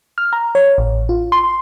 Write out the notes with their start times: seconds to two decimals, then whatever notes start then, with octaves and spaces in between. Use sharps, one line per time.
0.18 F6
0.33 A#5
0.55 C#5
0.78 A1
1.09 F4
1.32 C6